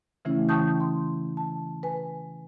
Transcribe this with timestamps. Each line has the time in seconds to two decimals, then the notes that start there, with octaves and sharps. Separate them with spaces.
0.25 C#3 E3 A3 C#4 E4
0.49 G5 A5 C#6 D#6 G6
0.80 C6
1.37 A5
1.83 B4 G#5